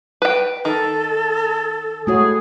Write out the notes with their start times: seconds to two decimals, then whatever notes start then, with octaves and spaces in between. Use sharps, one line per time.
0.22 B4 G5
0.65 D#3 A4
2.07 A2 G#3 A3 F#4 G#4 C#5